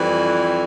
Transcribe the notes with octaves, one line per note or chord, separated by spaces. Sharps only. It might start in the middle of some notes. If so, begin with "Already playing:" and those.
Already playing: F2 E3 G3